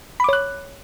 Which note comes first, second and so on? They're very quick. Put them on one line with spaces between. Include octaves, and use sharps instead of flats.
B5 D6 C#5 F#6